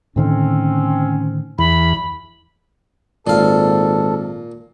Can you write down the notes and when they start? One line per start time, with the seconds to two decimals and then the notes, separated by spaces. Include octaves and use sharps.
0.16 A2 D3 D#3 C4 C#4
1.58 E2 B5
3.27 G#1 A#2 A4 F5